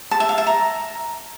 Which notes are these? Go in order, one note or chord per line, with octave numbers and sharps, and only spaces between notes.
A5
E5
F5
E5
A#5